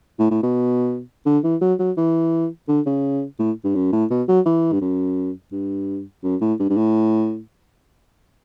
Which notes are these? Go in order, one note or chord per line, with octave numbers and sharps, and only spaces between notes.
A2
A2
B2
D3
E3
F#3
F#3
E3
D3
C#3
A2
G2
F#2
A2
B2
F#3
E3
G2
F#2
G2
F#2
A2
G2
G2
A2